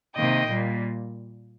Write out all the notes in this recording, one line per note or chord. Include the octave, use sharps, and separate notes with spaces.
C3 D#3 A#3 D#5 G5
A#2 G3 A#3